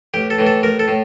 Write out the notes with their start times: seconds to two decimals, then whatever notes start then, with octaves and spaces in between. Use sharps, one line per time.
0.14 A1 G4
0.30 A4
0.39 A2 E3
0.47 A4
0.63 A1 A#4
0.79 A4
0.88 A2